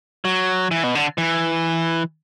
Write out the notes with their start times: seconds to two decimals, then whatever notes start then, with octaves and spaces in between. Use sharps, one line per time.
0.25 F#3
0.71 E3
0.84 B2
0.95 D3
1.18 E3